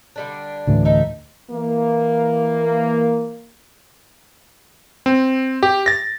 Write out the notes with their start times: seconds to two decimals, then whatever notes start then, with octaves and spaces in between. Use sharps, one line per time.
0.16 D3 G3 D4
0.67 D2 A2 E3
0.85 D#4 A4 E5
1.51 E3 A#3
5.06 C4
5.63 G4
5.86 A6 A#6